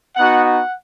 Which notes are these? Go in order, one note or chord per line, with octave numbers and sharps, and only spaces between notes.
B3 D#4 F#4 F#5
F#5